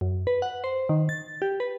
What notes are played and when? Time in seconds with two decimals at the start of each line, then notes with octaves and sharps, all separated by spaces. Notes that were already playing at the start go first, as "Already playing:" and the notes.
0.01 F#2
0.27 B4
0.42 F#5
0.64 C5
0.89 D#3
1.09 A6
1.42 G4
1.60 B4